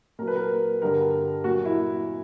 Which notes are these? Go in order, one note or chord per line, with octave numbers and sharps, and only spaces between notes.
A#2 F#3 A#4
B4
A#4
G2 D3 G3 A#4
A#2 F#3 F#4
E4